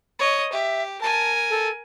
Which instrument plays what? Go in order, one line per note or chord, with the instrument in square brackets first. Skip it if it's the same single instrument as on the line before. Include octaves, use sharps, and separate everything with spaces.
[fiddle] C#5 D#5
[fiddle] G4 [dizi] E5
[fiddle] A#4 G#5 [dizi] A5
[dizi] A4